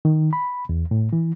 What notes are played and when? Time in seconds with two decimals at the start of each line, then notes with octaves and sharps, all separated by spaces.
0.05 D#3
0.33 B5
0.69 E2
0.91 A2
1.13 E3